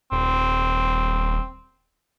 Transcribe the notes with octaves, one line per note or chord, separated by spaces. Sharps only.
D#1 C4